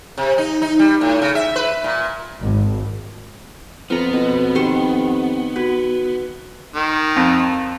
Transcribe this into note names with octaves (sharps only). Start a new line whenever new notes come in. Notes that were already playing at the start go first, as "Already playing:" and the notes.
C3
D#4
D#4
G3
A2
C#3
E5
B4
A#2
G#1
F2 B3 F4 A#5
F2 B2 F#4
D#3 G4 C6 C#6
F#4 B4
D#3
F2